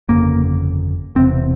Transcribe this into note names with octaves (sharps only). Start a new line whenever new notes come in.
G1 F2 C#3 A#3
E1 E2 C3 C4